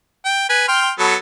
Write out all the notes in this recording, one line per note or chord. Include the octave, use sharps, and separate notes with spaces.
G5
B4 G#5
G5 C6 F6
F#3 B3 A4